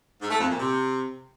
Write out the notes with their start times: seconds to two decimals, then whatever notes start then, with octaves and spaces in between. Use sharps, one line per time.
0.21 G#2
0.30 A3
0.40 F2
0.49 A#2
0.58 C3